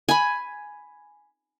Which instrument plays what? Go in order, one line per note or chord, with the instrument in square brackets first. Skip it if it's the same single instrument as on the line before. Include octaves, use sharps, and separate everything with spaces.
[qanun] G#5 B5